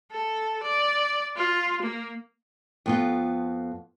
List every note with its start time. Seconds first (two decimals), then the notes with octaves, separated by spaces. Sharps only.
0.11 A4
0.63 D5
1.37 F4
1.82 A#3
2.86 F2 B3 F4